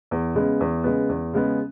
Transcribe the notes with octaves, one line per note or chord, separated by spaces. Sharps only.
E2
C#3 G#3 B3
E2
C#3 G#3 B3
E2
C#3 G#3 B3